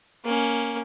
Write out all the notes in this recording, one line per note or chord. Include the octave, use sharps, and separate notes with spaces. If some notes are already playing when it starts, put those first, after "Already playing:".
A#3 C#4